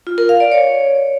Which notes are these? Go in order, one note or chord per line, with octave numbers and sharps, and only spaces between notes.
F4
A#4
F5
D5
C#5